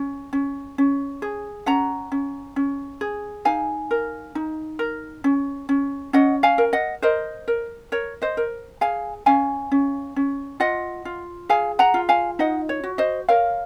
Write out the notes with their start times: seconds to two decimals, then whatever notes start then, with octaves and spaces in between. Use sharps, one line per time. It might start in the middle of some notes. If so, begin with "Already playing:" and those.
Already playing: C#4
0.33 C#4
0.78 C#4
1.22 G#4
1.66 C#4 F#5 A#5
2.12 C#4
2.56 C#4
3.01 G#4
3.45 D#4 F5 G#5
3.91 A#4
4.35 D#4
4.79 A#4
5.24 C#4
5.69 C#4
6.13 C#4 D#5 F#5
6.43 F5 G#5
6.58 A#4
6.73 D#5 F#5
7.02 A#4 C5 D#5
7.48 A#4
7.92 A#4 C#5
8.22 C5 D#5
8.37 A#4
8.81 G#4 F5 G#5
9.26 C#4 F5 G#5
9.72 C#4
10.16 C#4
10.60 F4 D#5 F#5
11.05 F4
11.49 G#4 F5 G#5
11.79 F#5 A#5
11.94 F4
12.09 F5 G#5
12.39 D#4 D#5 F#5
12.69 C#5
12.84 F#4
12.98 C5 D#5
13.29 A#4 C#5 F5